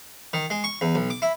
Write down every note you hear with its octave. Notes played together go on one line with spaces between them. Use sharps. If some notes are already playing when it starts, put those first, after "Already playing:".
D#3
G#3
C#6
E2
B1
D6
E4